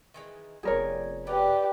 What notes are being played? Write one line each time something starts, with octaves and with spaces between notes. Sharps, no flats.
D#3 E3 G#3
F1 G3 B3 G#4 A#4 C#5
F4 G4 B4 D5 F#5